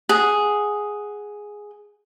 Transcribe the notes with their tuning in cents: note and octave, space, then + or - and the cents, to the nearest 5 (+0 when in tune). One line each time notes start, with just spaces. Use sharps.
G#4 +0 F#5 +0